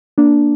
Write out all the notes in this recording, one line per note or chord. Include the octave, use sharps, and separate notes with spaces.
A#3 D4